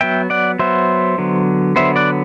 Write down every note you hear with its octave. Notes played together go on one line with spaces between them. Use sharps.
F#3 B3 E5 G5
D5 F#5
F#3 B3 C5 E5
D3 F#3 B3
D3 F#3 B3 C5 E5
D5 F#5